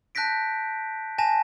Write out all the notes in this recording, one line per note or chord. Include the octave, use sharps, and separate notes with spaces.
A5 F#6 G6 A#6 B6 D7
G#5 A5 A#6 E7